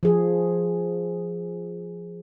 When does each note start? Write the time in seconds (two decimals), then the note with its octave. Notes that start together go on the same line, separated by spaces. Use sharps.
0.03 F3 G#4